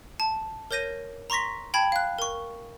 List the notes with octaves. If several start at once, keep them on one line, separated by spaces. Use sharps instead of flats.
A5
A#4 C#5 G6 A#6 D#7
A#5 C6 C#6 A#6 B6
G5 A5 B5 G#6
F5 F#6
A#4 C#6